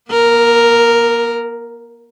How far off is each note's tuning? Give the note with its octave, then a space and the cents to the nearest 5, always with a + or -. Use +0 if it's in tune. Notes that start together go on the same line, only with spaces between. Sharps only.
A#3 +45 A#4 +0